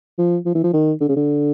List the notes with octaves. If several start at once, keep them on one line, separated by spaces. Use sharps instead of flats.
F3
F3
E3
F3
D#3
D3
C#3
D3